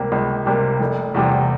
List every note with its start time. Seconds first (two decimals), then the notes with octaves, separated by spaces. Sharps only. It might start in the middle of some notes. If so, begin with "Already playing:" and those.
Already playing: C#2 C3 G3 A#3
0.12 C#2
0.46 C3 G3 A#3
0.81 F1
1.15 E2 C3 G3